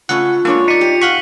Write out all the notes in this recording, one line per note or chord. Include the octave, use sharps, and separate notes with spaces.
C#3 A3 C#4 F4 F#5
G#3 A#3 D4 C#5
D#4 D5 B6 C#7 D#7
G4
F5 F#5 C#6 B6 F#7 G7